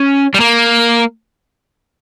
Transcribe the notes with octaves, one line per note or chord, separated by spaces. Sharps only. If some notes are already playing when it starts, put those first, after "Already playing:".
Already playing: C#4
G3
A#3